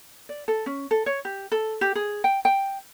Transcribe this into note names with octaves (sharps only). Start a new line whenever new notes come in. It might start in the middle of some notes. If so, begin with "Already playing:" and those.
D5
A4
C#4
A4
C#5
G4
A4
G4
G#4
G5
G5